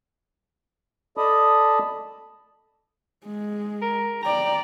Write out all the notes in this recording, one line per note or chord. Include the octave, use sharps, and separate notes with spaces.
A4 D5 D#5 A5 B5 D#6
G#3
A#4
D5 G5 A#5